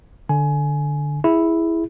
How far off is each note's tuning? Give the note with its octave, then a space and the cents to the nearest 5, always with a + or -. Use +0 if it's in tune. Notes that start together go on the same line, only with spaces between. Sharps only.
D3 +0 G#5 +20
E4 +0 G#4 -5